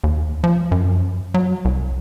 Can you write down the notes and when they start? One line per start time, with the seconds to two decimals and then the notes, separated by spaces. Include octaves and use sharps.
0.04 D#2
0.44 F3
0.72 F#2
1.34 F#3
1.65 C2